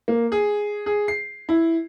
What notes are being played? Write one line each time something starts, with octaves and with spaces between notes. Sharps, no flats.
A#3
G#4
G#4
C7
E4